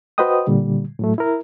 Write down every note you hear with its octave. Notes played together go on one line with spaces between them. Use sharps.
F#4 B4 C5 D#5 G5 D#6
A#2 D3 G3
A2 F#3 A3
E4 A#4